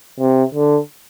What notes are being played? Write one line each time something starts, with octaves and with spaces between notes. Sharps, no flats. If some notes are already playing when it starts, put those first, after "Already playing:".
C3
D3